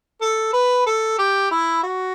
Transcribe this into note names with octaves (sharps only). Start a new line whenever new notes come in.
A4
B4
A4
G4
E4
F#4